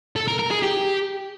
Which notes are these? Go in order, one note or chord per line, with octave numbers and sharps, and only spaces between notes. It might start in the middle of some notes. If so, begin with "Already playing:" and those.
A4
A#4
A#4
G#4
G4